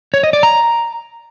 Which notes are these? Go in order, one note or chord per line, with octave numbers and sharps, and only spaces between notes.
C#5
D#5
D5
A#5